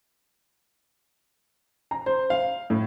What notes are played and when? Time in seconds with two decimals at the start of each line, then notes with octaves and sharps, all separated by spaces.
1.91 A#5
2.06 C5
2.30 F5
2.70 A2